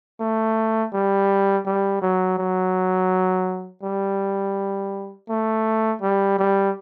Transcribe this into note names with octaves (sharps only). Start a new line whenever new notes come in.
A3
G3
G3
F#3
F#3
G3
A3
G3
G3